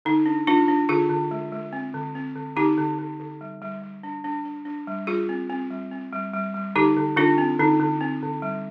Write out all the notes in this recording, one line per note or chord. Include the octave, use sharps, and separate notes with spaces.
D3 D#4
D4
D4 F4
D4
D3 F4 G#4
D3
G#3
G#3
C4
D3
C4
D3
D3 D#4 G4
D3
D3
D3
G3
G3
G3
D4
D4
D4
D4
G3
G3 F4 G#4
C4
C4
G3
C4
G3
G3
G3
D3 D#4 G4
D3
D3 D4 F4
C4
D3 D#4
D3
C4
D3
G3